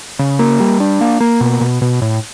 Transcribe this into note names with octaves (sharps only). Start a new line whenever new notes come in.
C#3
A#3
G3
D4
A#3
A#3
B2
B2
B2
A2